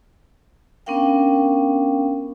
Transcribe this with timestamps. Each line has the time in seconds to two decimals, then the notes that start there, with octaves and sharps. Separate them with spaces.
0.86 B3 C#4 D4 A#4 F5 G5